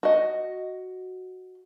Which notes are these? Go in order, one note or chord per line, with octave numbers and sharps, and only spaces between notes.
F#4 D#5